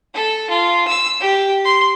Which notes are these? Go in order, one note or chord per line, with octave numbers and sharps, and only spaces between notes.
A4
F4
E6
G4
C6